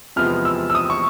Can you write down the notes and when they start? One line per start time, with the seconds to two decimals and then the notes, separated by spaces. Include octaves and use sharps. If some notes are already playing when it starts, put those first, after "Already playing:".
0.16 E2 C3 F3 G#3 B3 F6
0.45 E6
0.70 E6
0.75 D#6
0.90 C#6